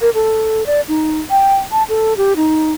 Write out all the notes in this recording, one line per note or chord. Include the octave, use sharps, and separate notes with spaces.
A#4
A4
D5
D#4
G5
A5
A4
G4
D#4